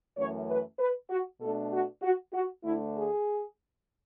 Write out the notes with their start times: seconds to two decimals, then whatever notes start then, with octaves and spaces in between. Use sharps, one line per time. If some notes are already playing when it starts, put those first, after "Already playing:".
0.17 F#2 E3 A3 C#4 C#5
0.48 B4
0.79 B4
1.10 F#4
1.40 B2 A3 D4 A4
1.72 F#4
2.02 F#4
2.33 F#4
2.64 D2 D3 A3 D4 E4
2.95 G#4